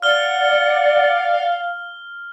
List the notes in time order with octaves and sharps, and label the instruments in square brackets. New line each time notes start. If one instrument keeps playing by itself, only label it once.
[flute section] D5 F#5 [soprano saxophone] F5 [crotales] F6 G7